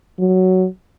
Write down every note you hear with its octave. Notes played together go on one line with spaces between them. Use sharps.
F#3